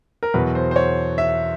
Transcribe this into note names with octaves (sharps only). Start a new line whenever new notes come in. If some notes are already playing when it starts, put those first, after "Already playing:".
A#4
E2 B2 F#3 B4
C5
C5
C#5
E5